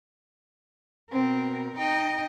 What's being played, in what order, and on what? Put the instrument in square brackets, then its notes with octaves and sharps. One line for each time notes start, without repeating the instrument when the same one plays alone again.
[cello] B2 A#4 [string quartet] C4
[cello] D#4 D#5 [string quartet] G5